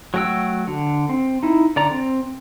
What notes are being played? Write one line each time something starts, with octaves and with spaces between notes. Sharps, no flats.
F#3 A3 F#4 G5 E6
D3
C4
D#4 E4
D3 D5 A#5
C4